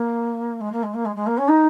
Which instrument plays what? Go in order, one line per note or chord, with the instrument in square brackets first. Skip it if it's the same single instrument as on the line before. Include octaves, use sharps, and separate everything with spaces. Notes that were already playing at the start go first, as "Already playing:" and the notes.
Already playing: [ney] A#3
G#3
A#3
G#3
A#3
G#3
G#3
A#3
C#4
D#4